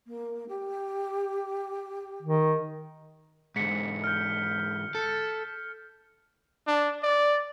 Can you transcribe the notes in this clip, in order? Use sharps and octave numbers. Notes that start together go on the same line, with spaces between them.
A#3
G4
D#3
G#2 D3 B6 C#7
F6 G6
A4
D4
D5